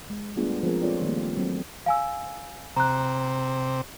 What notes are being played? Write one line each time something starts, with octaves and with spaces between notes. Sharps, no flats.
G#3
G3 A3 B3 D4 F4 G#4
F3 G#3 C4 G#4 A#4
C4 F4 A4 B4 C#5 D5
D#3 G3 A3 A#3 G4
F#3 C4 A4
F5 G#5 E6
C3 A#5 F#6